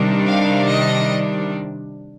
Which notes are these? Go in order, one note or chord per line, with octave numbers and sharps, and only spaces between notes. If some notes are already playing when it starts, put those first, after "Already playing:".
Already playing: C3 D#3 G3 D4
F5
D#5